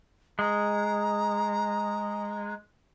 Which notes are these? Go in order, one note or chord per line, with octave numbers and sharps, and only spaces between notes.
G#3 A#5